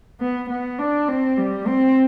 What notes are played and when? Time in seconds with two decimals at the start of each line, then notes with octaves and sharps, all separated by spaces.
0.21 B3
0.50 B3
0.79 D4
1.08 C4
1.38 G3
1.67 C4